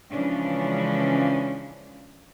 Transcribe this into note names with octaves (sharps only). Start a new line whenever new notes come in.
C#3 E3 F3 G#3 C#4 D4